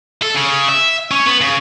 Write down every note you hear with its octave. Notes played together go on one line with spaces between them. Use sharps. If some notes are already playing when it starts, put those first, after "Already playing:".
A4
C#3
E5
C#4
B3
C#3